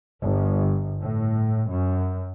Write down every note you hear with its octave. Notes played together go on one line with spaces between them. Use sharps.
G1
A2
F#2